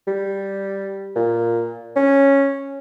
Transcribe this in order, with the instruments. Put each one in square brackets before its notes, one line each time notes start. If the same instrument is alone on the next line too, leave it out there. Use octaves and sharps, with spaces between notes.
[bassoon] G3
A#2
C#4